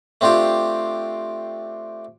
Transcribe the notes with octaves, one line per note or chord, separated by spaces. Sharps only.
A3 C4 D4 F4 G4